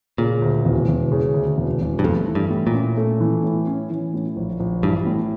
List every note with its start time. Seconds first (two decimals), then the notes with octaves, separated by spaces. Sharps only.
0.18 A#2 C#3
0.42 D2
0.65 E1
0.88 E1
1.12 C#3
1.34 D2
1.58 E1
1.82 E1
1.99 G2
2.04 F2 A3
2.28 E3
2.35 G2
2.50 A2
2.67 A#2
2.74 C#4
2.97 A3
3.20 E3
3.44 A2
3.67 C#4
3.90 E3
4.14 A2
4.36 A#1
4.60 A#1
4.83 G2 E3
5.06 A2